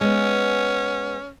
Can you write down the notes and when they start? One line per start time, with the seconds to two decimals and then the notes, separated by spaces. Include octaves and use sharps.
0.01 G#3 B3 C#4